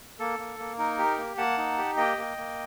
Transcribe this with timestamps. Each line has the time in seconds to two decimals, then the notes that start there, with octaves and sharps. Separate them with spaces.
0.19 A#3 A4
0.39 A#3
0.59 A#3
0.78 D#4 A#4
0.98 G4
1.18 A#3
1.37 A#3 F#5 A5
1.58 D#4
1.78 G4
1.97 A#3 D#5 G5
2.17 A#3
2.38 A#3